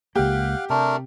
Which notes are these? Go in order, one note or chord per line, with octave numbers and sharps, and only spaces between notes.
C#2 A#3 G4 F5 F#5
C3 A3 D4 A#4